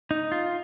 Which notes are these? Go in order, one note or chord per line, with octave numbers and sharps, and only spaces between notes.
D#4
F4